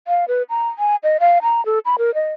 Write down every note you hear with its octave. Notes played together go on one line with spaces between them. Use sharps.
F5
B4
A#5
G#5
D#5
F5
A#5
A4
B5
A#4
D#5